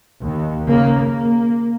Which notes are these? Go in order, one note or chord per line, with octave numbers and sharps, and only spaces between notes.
D#2
C#3 A#3
A#3